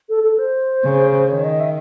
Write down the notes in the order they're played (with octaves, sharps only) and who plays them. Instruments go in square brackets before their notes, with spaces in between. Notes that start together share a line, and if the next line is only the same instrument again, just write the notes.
[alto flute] A4
A4
C5
[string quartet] C#3
[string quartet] D#3 [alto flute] C#5
[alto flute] D#5
E5